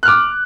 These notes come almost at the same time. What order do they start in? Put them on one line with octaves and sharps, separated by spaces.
F#6 F6 D6